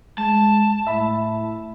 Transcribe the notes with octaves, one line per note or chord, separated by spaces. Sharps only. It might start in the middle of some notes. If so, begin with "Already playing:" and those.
G#3 A5
A2 E5 B5